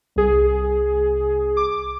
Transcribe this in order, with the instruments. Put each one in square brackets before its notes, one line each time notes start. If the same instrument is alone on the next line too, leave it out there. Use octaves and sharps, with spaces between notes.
[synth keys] C2 G#4
D6